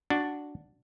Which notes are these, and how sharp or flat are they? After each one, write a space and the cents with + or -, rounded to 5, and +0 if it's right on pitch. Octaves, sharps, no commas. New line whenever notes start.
D4 +0 F#4 +0